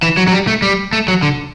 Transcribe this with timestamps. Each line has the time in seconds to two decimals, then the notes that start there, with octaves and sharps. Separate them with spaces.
0.03 E3
0.17 F#3
0.28 F#3
0.32 G3
0.47 A3
0.62 G3
0.93 A3
1.08 F#3
1.23 D3